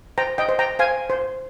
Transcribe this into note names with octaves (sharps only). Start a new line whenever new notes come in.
C5 G5 A#5
D#5 G5
C5
G5 A#5
C5 F5 G#5
C5